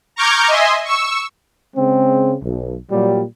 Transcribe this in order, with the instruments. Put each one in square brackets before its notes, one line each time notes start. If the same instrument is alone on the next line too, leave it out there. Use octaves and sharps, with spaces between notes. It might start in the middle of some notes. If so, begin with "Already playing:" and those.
[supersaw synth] A#5 C#6 D6 F6 G6 G#6
D#5 E5 G#5 C6
C#6 E6
[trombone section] C#3 G#3 C4
B1
A#2 F#3 G3